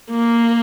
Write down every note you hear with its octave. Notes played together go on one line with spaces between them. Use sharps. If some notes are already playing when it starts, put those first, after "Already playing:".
A#3